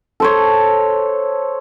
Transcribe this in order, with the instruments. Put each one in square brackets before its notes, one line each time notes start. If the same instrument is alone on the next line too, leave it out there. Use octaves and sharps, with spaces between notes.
[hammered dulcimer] A4 C5 C#5